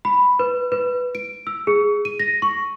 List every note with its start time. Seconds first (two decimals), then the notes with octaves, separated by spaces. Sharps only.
0.05 B5
0.39 B4
0.72 B4
1.15 D7
1.47 E6
1.67 G#4
2.05 D#7
2.19 A#6
2.42 C#6